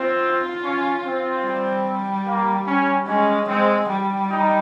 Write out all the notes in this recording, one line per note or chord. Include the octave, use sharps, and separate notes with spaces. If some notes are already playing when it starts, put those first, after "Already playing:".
Already playing: C4 F4
C#4
C4
G3
A#3
C#4
G#3 C#4
G#3 C4
G3
D#4